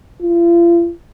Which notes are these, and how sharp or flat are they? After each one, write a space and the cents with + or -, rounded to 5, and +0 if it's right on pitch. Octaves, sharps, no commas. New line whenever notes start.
F4 -40